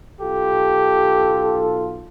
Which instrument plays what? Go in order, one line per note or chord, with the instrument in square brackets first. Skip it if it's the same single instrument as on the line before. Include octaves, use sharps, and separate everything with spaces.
[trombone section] B1 F4 A4 [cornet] G4